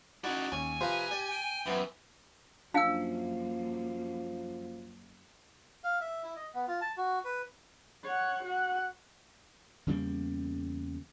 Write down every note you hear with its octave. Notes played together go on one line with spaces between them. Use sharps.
C#4 D#4 E4 F#4 D5 F#5
D#2 C#4 G#5
C3 F3 F4 B4 C5 A#5
G4 D5 G#6
G5
F#2 E3 B3 C4
F#2 F3 A#3 D4 D#5 F5 G#5 E6
F5
E5
E4
D#5
B3
F4
A5
F#4
B4
C#5 F#5
F#4 F#5
E2 C#3 G3 A#3